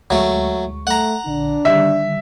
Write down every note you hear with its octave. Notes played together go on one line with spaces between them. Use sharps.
D2 F#3 G#3 A3 C#6
A3 F#5 A#5
A#1 D3 D4
D3 D#3 G3 E5